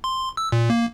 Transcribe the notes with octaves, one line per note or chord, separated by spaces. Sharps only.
C6
E6
A#2
A#3